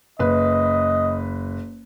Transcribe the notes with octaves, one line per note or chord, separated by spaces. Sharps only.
F#1 B4 D#5